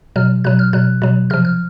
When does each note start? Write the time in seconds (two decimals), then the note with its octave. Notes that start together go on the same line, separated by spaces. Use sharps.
0.16 B2 F#3 F6
0.44 B2 F#3 F#6
0.59 F6
0.73 B2 F#3 F#6
1.02 B2 F#3
1.30 C3 F3 F6
1.45 F6